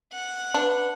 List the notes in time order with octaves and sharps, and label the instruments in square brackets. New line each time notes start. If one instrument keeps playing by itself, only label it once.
[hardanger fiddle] F#5
[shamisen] D4 [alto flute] B4